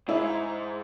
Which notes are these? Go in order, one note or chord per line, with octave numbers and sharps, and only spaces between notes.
G#2 E4